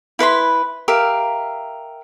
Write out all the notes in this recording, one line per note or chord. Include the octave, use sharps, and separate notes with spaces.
E4 B4 B5 C6
G4 A#4 E5 F5